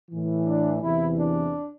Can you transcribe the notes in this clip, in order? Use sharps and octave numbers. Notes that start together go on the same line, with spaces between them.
A2 E3
D4
E2 C3 E3 E4
D4